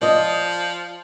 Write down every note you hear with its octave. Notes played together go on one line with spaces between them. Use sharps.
F3 D5 D#5